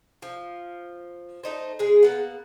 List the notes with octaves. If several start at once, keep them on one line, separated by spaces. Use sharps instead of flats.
F3
A3 D#4 C5
G#3 G#4
A#3 B3 F#5